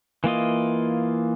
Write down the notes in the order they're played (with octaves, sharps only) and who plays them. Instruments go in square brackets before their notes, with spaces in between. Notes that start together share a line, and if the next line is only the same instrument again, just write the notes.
[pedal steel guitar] E3 A#3 F4 D#5